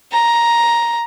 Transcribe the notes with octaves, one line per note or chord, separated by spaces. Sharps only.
A#5